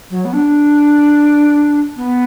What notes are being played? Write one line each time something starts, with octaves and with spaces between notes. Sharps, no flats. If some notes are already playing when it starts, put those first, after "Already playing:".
F#3
B3
D4
B3